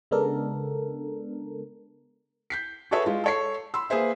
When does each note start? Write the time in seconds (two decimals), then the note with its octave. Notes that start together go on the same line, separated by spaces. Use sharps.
0.11 C#3 G#3 B3 D4 A4 A#4
2.50 G6 B6 C7
2.91 F#4 G#4 A4 B4 C#5 E5
3.06 G#3 F4
3.24 A4 C#5 C7
3.74 B5 C6 E6
3.90 A#3 G#4 B4 C5 E5